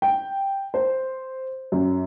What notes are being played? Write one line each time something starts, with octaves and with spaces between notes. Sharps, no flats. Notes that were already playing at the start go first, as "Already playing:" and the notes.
G5
C5
F#2